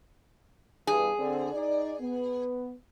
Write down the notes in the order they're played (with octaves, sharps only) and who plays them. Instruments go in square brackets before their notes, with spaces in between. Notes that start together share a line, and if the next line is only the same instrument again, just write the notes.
[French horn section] E2 G2 [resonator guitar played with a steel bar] G#4
[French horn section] D3 C4
D#4 D5
B3